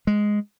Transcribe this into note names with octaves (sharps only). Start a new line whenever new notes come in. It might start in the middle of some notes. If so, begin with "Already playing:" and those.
G#3